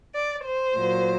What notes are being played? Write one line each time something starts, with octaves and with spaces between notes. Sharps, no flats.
D5
C5
A#2 F#3